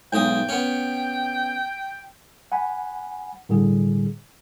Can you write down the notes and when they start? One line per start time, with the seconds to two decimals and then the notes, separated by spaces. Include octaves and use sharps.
0.13 B1 G#2 G5 D#6
0.49 B3 C#4
2.52 F#5 G#5 B5
3.49 A2 D3 G3 G#4